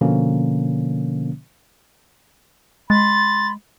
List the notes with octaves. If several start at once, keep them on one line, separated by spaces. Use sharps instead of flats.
B2 D3 F3 A#3 C#4
G#3 B5 C6 A6